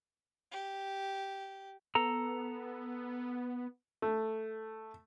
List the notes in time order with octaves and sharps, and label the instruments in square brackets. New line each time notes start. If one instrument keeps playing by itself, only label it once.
[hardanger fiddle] G4
[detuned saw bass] B3 [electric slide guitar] A4 A#5
[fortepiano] A3